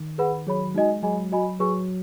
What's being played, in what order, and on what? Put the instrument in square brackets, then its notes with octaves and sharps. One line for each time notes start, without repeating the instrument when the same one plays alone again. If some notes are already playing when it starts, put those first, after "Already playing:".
Already playing: [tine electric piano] D#3
[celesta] G#4 B4 F#5 B5
[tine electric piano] F#3 [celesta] G#4 C#5 B5
[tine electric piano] G#3 [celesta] D#4 F#4 D#5 G#5
[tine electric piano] F#3 [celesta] G#4 D#5 G#5 B5
[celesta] F#4 D#5 G#5 B5
[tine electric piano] F#3 [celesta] G#4 B4 G#5 C#6